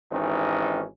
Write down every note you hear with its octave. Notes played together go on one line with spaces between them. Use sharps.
G#1 E3 C#4 D#4 G4